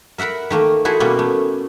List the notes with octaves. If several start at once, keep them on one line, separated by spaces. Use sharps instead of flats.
A#4 E5 F#5 A#5 B5
D#3 A3 A#3
E4 F#4 G#4 A4 C5
B2 G3 A#3 B3 C#4
A3